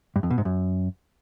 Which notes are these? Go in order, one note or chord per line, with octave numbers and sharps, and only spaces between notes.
G2
F2
B2
G#2
F#2